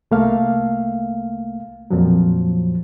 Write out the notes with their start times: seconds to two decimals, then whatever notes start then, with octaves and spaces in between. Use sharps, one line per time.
0.11 C2 A3 A#3 F5
1.91 F2 A#2 F3 F#3